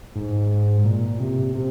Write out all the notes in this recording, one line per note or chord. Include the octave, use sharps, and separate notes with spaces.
G#2
A#2
C3
C3